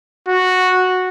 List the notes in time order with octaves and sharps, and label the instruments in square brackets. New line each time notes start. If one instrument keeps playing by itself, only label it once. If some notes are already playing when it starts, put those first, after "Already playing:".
[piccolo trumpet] F#4